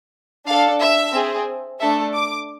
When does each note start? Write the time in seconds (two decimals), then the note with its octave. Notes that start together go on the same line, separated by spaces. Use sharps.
0.47 D4 A4 F5
0.80 E5
1.13 C4 G#4
1.80 A3 D4 A4 E5
2.14 D6